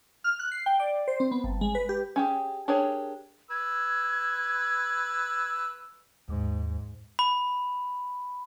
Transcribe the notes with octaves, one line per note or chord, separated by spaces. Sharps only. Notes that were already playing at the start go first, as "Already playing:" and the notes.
F6
F#6
C7
G5
D5
C5
C4
B3
G1
G#3
B4
G4
C#4 G4 G#4
D4 G4 G#4 A#4 C#5
B4 E6 G#6
D#2 G#2
B5